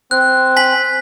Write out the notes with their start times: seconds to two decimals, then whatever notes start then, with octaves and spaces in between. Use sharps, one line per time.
0.11 C4 F#6
0.56 G#5 B6 F#7